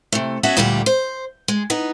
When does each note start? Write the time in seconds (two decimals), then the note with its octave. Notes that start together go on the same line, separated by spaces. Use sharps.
0.12 C3 A3
0.43 B3 C#4 F#4 A4 C#5 E5
0.57 D2 A#2 D3 G3 A3 G4
0.86 C5
1.48 G#3
1.70 B3 D#4